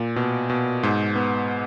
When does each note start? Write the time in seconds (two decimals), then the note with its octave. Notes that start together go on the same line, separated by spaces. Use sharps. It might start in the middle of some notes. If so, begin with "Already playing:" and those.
Already playing: A#2
0.16 B2
0.50 B2
0.83 G#2
1.16 B3